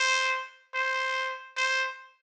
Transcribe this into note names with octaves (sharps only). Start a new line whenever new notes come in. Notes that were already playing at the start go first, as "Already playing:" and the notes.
Already playing: C5
C5
C5